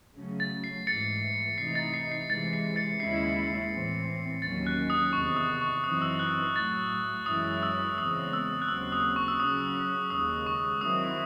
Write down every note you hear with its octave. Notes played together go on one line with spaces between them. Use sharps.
C#3 F#3 A3 C#4
A6
C7
G#2 E3 A3 A6 C#7
C3 E3 A3 D#4 C7
A6
C7
C7
C3 E3 G#3 A6
C7
A6 C#7
D#2 C#3 G#3 C#4 E4 C7
A2 E3 C4
D#2 D#3 F#3 C#4 A6
F#6
D#6
E2 C3 D#3 C#6
D#6
C#6
F#2 E3 C4 D#4 D#6
E6
F#6
A2 F#3 A3 A6
F#2 E3 G#3 C#4 E4 D#6
E6
E2 C#3 G#3 C4 D#6
E6
F#6
D#2 C#3 F#3 C4 E6
D#6
C#6
E6
C#3 F#3 C#4 D#6
D#2 C#3 G#3 D#6
C#6
D#3 F#3 C4 E4 D#6